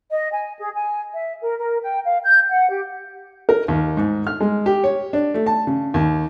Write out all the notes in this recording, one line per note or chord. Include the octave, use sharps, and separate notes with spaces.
D#5
G#5
G#4
G#5
E5
A#4
A#4
G5
F5
G6
F#5
G4
A#4
D#2
G#2
F6
G#3
G4
C#5
D4
A3
A5
C#3
D#2